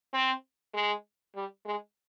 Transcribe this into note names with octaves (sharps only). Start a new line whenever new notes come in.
C4
G#3
G3
G#3